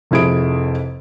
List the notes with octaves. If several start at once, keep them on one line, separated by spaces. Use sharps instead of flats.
F1 F2 E4 G#4 D7